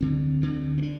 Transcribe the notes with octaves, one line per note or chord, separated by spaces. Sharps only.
D2 D3 C4
D2 D3
C4
D3 D4